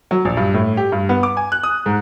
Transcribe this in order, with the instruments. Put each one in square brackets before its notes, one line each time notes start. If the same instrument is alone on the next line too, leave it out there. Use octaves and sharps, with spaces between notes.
[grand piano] F#3
A#1
G2
A2
G4
G2
B3
D6
G#5
F#6
D#6
G#2